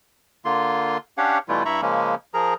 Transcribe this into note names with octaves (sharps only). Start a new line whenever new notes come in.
D3 A#3 F4 C6
C#4 D4 G4 C#5 F5 F#5
B2 E3 G3 A3 E4 F4
G2 E4 E5 A#5 B5 C#6
C#3 F3 G#3 A#3 C#4
F3 G#4 A#4 A#5